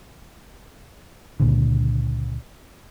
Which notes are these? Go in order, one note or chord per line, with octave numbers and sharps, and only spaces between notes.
C#2 A#2 D3